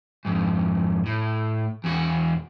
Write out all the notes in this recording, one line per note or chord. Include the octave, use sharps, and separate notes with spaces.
F2 G#2
A2
E2 F#4